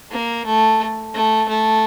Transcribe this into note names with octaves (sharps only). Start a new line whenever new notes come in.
A#3
A3
A3
A3